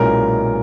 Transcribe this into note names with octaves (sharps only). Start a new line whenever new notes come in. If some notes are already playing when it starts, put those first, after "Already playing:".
Already playing: B1 A#2 G#3 C#4 E4 A#4